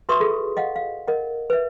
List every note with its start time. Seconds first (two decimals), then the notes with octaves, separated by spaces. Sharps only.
0.09 F#4 B4 E5 C6 C#6 D#6
0.20 F4 G#4 A4
0.57 D#5 F5 F#5
0.76 F5
1.08 A#4 D#5 F#5
1.50 B4 E5